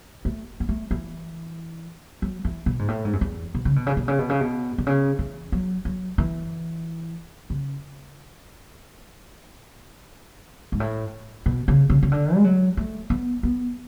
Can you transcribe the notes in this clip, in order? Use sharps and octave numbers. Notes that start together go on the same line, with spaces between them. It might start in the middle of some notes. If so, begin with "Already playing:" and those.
A3
B3
A3
E3
F#3
E3
B2
G#2
A2
G#2
F#2
E2
B2
C#3
B2
C#3
B2
C#3
B2
C#3
B2
B2
C#3
E3
F#3
F#3
E3
C#3
G#2
A2
B2
C#3
C#3
C#3
D3
G#3
F#3
A3
B3
B3